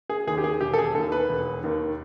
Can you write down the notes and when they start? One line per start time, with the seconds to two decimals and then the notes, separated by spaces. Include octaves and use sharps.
0.10 G#4
0.27 D#2 D#3 G#4
0.38 G4
0.44 G#4
0.61 E1 G4
0.73 A4
0.78 G#4
0.95 D#2 D#3 A4
1.12 B4
1.29 E1
1.64 D#2 D#3